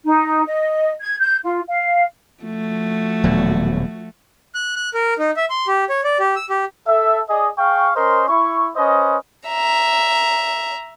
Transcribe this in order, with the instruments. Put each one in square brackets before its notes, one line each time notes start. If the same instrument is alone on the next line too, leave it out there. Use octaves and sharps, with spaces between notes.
[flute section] D#4
D#5
G#6
G6
F4
F5
[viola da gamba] F3 A3 F#4
[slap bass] D#1 B2 F#3
[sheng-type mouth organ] F#6
F#6
A#4
D#4
E5
C6
G4
C#5
D5
G4
E6
G4
[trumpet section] A4 E5
G#4 D5 D#5
G#4 F5 G5 C#6
C#4 A#4 C5 D#5 C6
E4 C#6
C#4 B4 C5 D#5
[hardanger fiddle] E5 A#5